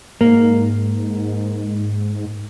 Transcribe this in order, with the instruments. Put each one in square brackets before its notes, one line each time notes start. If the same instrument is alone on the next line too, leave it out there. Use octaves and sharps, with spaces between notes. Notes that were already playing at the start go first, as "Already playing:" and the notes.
[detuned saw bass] G#2 [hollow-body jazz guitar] A#3